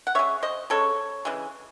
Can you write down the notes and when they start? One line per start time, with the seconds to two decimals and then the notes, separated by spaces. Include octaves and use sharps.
0.07 F#5
0.15 C#3 G#3 C#5 E5
0.43 C5 D#5
0.70 C#3 G#3 A4 C#5
1.25 C#3 E3 G#3